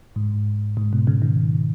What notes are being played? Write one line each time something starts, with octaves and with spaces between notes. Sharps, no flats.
G#2
G#2
B2
C#3
D#3